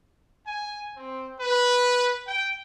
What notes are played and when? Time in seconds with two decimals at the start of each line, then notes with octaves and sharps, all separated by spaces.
0.47 G#5
0.96 C4
1.40 B4
2.26 G5